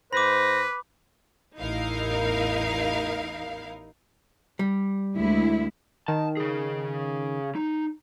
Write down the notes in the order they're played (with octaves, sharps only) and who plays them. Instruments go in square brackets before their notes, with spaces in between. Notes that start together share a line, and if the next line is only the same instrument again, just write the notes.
[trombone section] G#2 C5 [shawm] B4 [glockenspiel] B5 D6 [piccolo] A#6
[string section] A1 E2 D#4 E4 A#4 F5
[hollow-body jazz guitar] G3
[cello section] D2 G#3 E4
[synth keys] D#3 [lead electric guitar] A5
[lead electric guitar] C#3 G#4
D#4